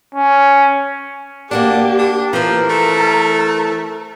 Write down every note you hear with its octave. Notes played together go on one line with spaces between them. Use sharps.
C#4
A#3 D4 F#4 G4 D5
D4
E3 F3 C4 A#4
A3